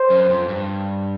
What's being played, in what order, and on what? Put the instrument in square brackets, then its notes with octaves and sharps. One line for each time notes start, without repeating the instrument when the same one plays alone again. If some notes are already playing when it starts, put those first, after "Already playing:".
Already playing: [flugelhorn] C5
[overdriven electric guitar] F#2
F2
G2